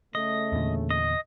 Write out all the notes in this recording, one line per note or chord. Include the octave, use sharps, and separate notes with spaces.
C#3 A3 D#5
E2 A#2 D3
D#5